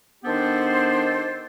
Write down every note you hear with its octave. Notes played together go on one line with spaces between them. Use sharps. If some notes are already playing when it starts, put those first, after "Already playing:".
D#3 B3 D4 G4 A4 C5